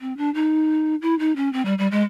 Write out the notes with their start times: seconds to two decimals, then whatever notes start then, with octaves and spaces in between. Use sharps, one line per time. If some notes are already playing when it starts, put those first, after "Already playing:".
0.01 C4
0.17 D4
0.34 D#4
1.02 E4
1.19 D#4
1.36 C#4
1.53 C4
1.65 G3
1.78 G3
1.91 G#3